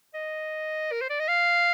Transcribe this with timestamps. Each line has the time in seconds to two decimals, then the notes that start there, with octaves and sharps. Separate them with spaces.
0.14 D#5
0.92 A#4
1.01 C5
1.10 D5
1.19 D#5
1.28 F5